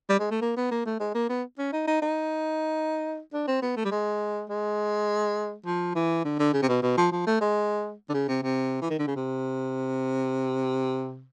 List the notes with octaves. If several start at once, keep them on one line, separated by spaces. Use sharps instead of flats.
G3
G#3
A3
A#3
B3
A#3
A3
G#3
A#3
B3
C#4
D#4
D#4
D#4
D4
C4
B3
A3
G3
G#3
G#3
F3
E3
D3
D3
C#3
C3
B2
B2
F3
F3
A3
G#3
D3
C#3
C3
C3
E3
D#3
D3
C#3
C3